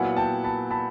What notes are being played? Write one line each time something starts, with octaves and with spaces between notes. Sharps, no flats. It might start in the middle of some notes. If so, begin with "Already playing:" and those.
Already playing: A#2 F#3 B3 E4 F#5 G#5
G5 A5
A5 B5
A5 B5